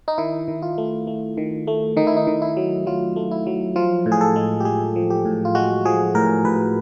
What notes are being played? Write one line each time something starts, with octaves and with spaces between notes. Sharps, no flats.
D#4
D#3 E4
D#3
F4
A3
A3
D#3
A3
D#3 D#4
E4
D#4
D#3
E4
F#3
F#3 F4
A3
E4
F#3
F3 F4
A2
G#4
A4
G#3
G4
G#3 G#4
F3
G4
A2
F4
G#3 F#4
F3 G#4
A2 A#4
A2 B4